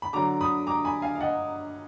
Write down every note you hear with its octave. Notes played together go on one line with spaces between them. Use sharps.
B5
D3 F#3 A#5 D6
B5 D#6
A#5 D6
G#5 B5
F5 G#5
F5
D#5 F#5